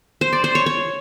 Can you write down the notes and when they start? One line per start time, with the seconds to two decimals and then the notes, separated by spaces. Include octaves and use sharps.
0.21 C5
0.33 D5
0.44 C5
0.55 C#5
0.66 C#5